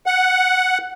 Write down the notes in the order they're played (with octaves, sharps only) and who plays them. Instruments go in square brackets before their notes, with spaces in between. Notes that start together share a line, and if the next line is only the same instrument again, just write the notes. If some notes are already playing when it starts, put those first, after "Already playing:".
[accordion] F#5